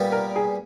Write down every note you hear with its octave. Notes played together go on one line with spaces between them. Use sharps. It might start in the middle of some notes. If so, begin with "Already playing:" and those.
Already playing: A#2 G3 B3
A#4
G#4